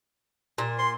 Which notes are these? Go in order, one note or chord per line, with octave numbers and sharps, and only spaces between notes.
A#2
C6